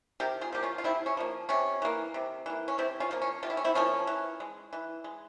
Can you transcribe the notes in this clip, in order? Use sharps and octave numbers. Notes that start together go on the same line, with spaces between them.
C3 G4 A#4
F4 G#4
F3 A#3 G4
C#4 F4
F4
C3 C4 E4
C#4
F3 A#3
C3 C#4
E3 A#3
C3
E3 A#3
C#4
C3 C4 E4
C#4 F4
F3 A#3
C#4
C3 F4
E4
C#4
C4 E4
F3 A#3 C#4
E3
G#3
E3
G#3